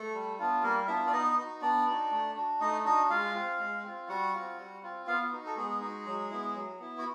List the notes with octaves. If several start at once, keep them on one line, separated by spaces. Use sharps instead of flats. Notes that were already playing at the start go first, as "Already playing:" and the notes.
Already playing: A3 A4
G3
B3 D4 F4
G3 A#3 A#4
B3 D4 E4 F4 E5
D5
B3 D#4 D#5
D#4 F#4
B3 D4 D5
D#4 F#4
A3
D4 F#4
A3 D#4 D#5
D4 D#4 F#4 D#5
G#3 F4 F5
C4 F4
G#3
C4 F4
G3 F#4 F#5
C4 F4
G3
C4 F4
B3 F4 F5
D#4 F#4
A4
G#3 B3 G#4
D#4 F#4
F#3
B3 E4
F#3
B3 E4
F#4